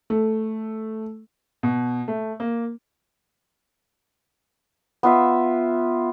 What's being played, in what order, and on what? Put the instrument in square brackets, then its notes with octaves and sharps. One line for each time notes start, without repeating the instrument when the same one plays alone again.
[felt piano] A3
[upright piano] B2
A3
A#3
[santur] B3 F4 E5